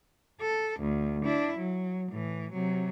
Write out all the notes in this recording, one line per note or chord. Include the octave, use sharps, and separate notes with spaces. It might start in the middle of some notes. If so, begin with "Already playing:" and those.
A4
D2
D4 E4
F#3
A2 E3
C3 F#3